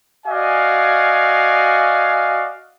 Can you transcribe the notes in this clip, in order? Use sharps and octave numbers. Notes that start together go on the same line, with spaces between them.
F#4 D5 D#5 F5 G#5